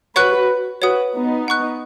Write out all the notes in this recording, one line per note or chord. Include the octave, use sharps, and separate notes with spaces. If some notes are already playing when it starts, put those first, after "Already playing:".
F#4 B4 C#5 F#5 C#6 F#6
F#4 B4 C#5 F#5 D#6
B3 D#4
F#5 C#6 F#6